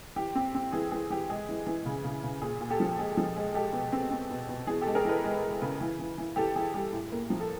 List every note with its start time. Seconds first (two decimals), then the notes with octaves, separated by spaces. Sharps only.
0.16 E3 G4
0.35 C4
0.55 C4
0.72 E3 G#4
0.91 E3 G#4
1.10 E3 G4
1.30 G#3 G#4
1.49 E3
1.67 E3
1.86 C#3
2.04 C#3
2.23 C#3
2.41 A#2 G#4
2.60 A#2
2.70 G4 A4
2.80 F3
2.99 G#3 G#4
3.17 F3
3.37 G#3
3.54 G#3 G4 A4
3.73 B2
3.92 C4
4.10 C4
4.30 B2
4.49 B2
4.67 E3 G#4
4.81 G4 A4
4.87 G#3
4.95 G#4 A#4
5.05 E3 A4 B4
5.24 G#3
5.42 G#3
5.62 C#3
5.81 E3
5.99 E3
6.18 E3
6.36 E3 G4 A4
6.55 E3 G#4
6.74 G3 G4
6.93 A2
7.12 A#3
7.30 F3
7.40 A4